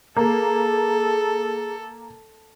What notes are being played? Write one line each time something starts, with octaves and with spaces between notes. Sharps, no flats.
A#3 G#4 A4